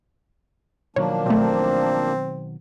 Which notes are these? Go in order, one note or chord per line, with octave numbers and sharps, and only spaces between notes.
B2 D#3 F3 F#3 A#3 D4 C#5
B1 A3 C4